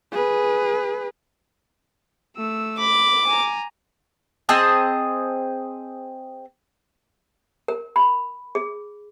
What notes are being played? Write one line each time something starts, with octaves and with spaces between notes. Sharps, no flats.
G#4 B4
A3 E6
B5 D6
G#5 A#5
C4 G#4 D#5 A5
A#4
B5
G#4